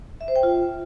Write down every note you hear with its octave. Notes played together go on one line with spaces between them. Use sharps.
E5
C5
G5
F4